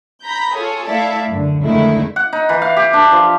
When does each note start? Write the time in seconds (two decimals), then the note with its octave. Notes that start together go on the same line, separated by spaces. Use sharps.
0.24 A#5 B5 G6
0.57 F4 G#4 A4 C#5
0.88 A3 E4 A4 D5 E5 F5
1.31 F#2 D3
1.62 F2 D3 D#3 G#3 A3 E4
2.16 F#5
2.33 D#4
2.49 E3
2.62 F5
2.77 G4
2.93 D4
3.12 F3